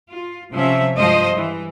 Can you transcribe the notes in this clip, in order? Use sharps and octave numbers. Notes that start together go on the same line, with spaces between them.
F4
C3 F3 C#4 E5
G2 F3 G#3 C5 D#5
E3